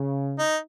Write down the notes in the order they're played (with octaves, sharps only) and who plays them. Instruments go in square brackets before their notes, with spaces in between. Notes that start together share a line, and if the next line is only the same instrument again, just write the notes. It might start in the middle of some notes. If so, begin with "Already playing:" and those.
Already playing: [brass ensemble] C#3
[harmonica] D#4